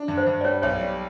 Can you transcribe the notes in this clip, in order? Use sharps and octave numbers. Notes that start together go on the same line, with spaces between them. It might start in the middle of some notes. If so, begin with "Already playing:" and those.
Already playing: D4
G2
C5
G2
D5
G3 C#5
B1 C#5
D5
G3